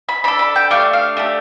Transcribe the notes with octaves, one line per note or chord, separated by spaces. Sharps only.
B5
D4 A4 B5
B5
G5
A3 D4 G4 F5
F5
A3 D4 G4